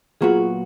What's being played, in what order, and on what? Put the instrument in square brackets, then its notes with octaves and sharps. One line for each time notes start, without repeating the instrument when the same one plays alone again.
[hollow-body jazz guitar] A#2 F#3 B3 F#4 [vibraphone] F4 G#4